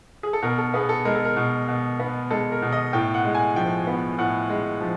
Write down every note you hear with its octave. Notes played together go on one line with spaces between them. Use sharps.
G#4
A4
B2 A#4
A4
B3 G#4
A4
G#3 A#4
A4
A#4
B2
B2
B3
G#3 A4
A#4
B2
D#5
A2 G5
F#5
G#3
G#5
F3 G5
B3
A2 F#5
G#3
F3